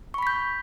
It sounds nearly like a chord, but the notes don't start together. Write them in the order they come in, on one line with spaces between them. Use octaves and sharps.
C#6 B5 B6 G6